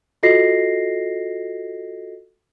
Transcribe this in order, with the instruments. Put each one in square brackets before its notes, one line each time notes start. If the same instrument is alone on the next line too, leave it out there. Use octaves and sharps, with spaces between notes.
[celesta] F4 F#4 A4 D#5 A#6 C7